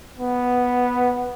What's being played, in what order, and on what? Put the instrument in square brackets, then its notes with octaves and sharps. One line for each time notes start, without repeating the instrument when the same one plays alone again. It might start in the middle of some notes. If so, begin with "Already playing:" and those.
[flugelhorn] B3